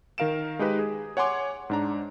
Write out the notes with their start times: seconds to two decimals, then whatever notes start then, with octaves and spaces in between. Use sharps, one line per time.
0.18 D#3 A#4 F5 D7 E7
0.59 G#3 D#4 G4 B4 D#5
0.79 G#4
1.17 C#5 F#5 G#5 C6 D6
1.70 G#2 D4 A#5